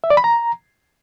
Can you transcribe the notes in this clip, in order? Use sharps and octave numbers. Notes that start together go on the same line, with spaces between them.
E5
D5
B5
A#5